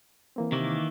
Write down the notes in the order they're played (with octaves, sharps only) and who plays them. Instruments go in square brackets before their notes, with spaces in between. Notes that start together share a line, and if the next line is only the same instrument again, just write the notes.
[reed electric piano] E3 A#3 C4
[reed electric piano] C3 [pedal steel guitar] D#3 E3 A#3